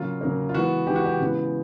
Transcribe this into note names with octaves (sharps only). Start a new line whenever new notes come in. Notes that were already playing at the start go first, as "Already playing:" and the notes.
Already playing: C#3 F#3 A#3 F4
C#3 F#3 A#3
F4
E3 G#3 B3 F#4
E3 G#3 B3 G4
F#4
G4
C#3 E3 G#3 B3